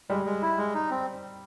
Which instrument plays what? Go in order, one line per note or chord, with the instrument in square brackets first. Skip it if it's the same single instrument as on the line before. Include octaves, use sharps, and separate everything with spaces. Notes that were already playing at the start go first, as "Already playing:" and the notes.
[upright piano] G3 [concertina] G#3
[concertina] G#3
E4
G#3
D#4
C4